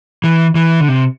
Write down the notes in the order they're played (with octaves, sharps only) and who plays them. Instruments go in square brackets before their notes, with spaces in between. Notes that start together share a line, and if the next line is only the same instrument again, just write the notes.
[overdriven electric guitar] E3
E3
D3
C3